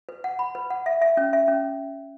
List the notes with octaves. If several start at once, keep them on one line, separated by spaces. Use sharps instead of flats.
B4
F#5
B5
B4
F#5
E5
E5
C#4
E5
C#4